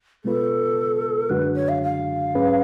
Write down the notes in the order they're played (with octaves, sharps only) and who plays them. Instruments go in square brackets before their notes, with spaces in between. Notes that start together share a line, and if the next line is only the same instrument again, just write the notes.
[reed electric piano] B2 G#3 B3 F4 B4 [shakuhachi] A4
[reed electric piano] F#2 D3 G#3 D4 F#4 [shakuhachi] B4
[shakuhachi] C#5
F5
F5
[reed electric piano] G#2 F#3 C#4 G#4 B4